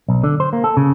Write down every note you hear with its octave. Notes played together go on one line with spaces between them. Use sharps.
B1
D3
C5
A#3
A4
C#3